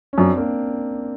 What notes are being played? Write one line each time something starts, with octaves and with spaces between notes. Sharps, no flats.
C#4
F#2 C4 D4
A#3 C4